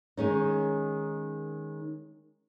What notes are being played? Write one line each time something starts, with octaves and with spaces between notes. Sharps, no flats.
D#3 G#3 C#4 D#4